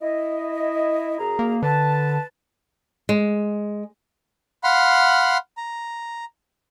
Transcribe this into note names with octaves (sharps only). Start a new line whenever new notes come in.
E4 D#5
F#2 G#4 A#5
A#3
D3 B4 A5
G#3
F5 F#5 B5 C6 F6
A#5